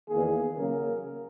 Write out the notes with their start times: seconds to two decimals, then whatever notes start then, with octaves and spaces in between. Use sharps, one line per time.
0.09 E2 D#3 A#3 G#4
0.56 C#3 F#3 A#3 A#4